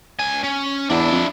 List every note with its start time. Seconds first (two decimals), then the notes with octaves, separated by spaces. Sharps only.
0.20 C#2 G#5
0.44 C#4
0.90 E2 D4 E4
1.13 F2